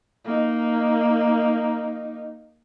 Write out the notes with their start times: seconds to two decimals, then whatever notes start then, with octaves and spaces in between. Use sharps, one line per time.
0.25 A#3 D#4